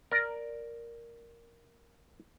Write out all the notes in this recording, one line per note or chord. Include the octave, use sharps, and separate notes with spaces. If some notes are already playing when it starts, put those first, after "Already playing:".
A#4 D5